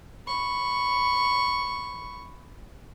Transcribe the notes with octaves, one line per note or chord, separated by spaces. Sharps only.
B5 C#6